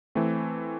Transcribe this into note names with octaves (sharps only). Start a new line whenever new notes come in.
E3 A3 C4